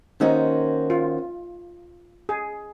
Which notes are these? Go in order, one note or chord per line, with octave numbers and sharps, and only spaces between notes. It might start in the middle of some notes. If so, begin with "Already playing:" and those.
D#3 A#3 C#4 D#4 F#4 C5
F4
G#4